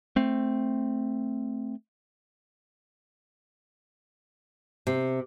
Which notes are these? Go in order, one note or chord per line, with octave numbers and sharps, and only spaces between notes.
A3 C4
C3